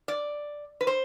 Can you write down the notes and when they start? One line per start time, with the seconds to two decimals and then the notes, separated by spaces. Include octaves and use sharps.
0.08 D5
0.81 B4
0.87 C5